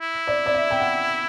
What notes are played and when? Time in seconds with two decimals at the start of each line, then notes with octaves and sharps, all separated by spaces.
0.01 E4
0.27 D5
0.46 D5
0.54 E5
0.71 G5
0.80 F#5